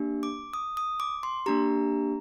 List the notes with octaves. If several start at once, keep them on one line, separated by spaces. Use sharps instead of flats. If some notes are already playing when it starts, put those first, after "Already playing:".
Already playing: A#3 D4 G4
D6
D#6
D#6
D6
C6
A#3 D4 G4 A#5